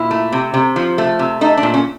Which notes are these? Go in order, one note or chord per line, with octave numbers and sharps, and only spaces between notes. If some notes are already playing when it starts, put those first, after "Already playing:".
Already playing: A#2 E4
A3
C3
C3
F3
A3
C3
A3 D#4
D4
A#2
C#4